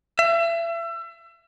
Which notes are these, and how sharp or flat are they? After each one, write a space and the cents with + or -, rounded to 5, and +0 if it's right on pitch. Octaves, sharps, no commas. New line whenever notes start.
E5 +35